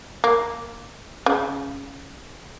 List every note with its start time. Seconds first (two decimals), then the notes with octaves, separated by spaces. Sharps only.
0.24 A#3
1.26 C#3